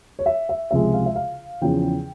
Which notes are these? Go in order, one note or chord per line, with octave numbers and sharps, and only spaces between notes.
C#5
E5
E5
C#2 C3 F3 G#3 E5
F5
E5
F5
E2 C#3 F3 G5